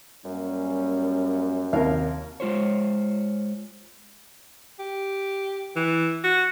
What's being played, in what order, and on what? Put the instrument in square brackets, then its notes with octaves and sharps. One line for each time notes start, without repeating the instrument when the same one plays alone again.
[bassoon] F#2 [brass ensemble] G3 A#3 C#4
[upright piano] D#2 C3 [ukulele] A#4 F5
[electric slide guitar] G#3 F4 C5 C#5
[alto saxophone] G4
E3
F#4